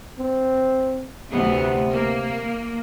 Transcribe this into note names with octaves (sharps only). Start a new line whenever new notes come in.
C4
D2 C3 E3 B3
A#3